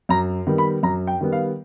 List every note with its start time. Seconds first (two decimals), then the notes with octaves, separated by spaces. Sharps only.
0.09 F#2 A#5
0.47 D#3 G3 B3
0.58 B5
0.83 F#2 A#5
1.07 G5
1.21 D#3 G3 B3
1.32 F5